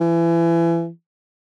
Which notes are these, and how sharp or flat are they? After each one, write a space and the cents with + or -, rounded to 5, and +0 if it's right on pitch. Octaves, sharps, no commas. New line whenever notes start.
E3 +30